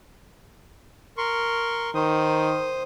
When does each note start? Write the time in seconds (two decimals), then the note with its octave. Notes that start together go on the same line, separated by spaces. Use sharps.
1.18 A#4 C6 C#6
1.95 D#3 C5 D#6